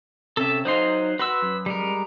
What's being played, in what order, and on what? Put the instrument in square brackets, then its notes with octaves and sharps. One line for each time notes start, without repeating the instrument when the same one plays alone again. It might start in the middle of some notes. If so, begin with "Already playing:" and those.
[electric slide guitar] C3 C#4 [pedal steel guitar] A4 E5
[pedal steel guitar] F#3 D#4 C6 [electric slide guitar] C5 D#5 F5
[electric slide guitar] F#4 [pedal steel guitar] B4 C6 E6
[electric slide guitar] F#2
[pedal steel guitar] G3 G#3 A#4